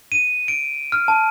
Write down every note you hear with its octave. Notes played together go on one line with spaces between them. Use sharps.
D#7
D7
F6
A5